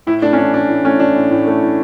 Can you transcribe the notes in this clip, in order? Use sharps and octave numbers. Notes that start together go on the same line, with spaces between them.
A2 E4
A3 D4
C#4
E3 D4
A2 D4
A2
A3 C#4
E3 D4
A2
A2
A3
E3